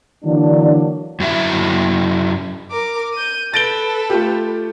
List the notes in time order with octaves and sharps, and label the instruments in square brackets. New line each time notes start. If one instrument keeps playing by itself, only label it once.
[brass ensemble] D3 E3 F#3 A#3 D4
[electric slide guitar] F#2 F#3 E4 E5
[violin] A#4 D6
G6 D#7
[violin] A4 B4 [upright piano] A6 D7 G7
[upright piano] A3 F4 G4